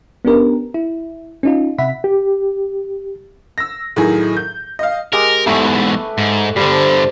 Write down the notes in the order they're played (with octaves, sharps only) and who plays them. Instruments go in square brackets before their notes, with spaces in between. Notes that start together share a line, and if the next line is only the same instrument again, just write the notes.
[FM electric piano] B3 C#4 D4 G4 A#4
E4
C#4 D#4 F4
C3 E5 F#5 B5 B6
[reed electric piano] G4
[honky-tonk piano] E6 A#6
A2 D#3 F#3 G#4
G6
D#5 F5
[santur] G#3 G4 [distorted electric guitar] A#4
[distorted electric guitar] E2 G#2 [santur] A3 B5 C#6
[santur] B4
[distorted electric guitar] G#2
[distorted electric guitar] G2 D3 [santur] G3 C5